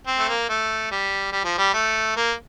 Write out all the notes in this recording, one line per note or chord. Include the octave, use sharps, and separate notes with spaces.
C4
A3
A#3
A3
G3
G3
F3
G3
A3
A#3